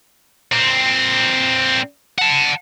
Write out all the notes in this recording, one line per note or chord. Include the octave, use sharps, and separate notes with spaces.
A#2 C4
F#5 A5